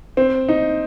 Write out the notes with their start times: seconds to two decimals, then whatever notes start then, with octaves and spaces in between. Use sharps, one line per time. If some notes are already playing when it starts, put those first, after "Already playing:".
0.17 C4
0.49 D#4